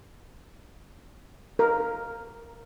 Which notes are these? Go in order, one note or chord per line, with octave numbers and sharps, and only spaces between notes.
A#4